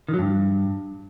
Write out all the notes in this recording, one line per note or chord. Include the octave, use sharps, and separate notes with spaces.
D#3
F#3
G2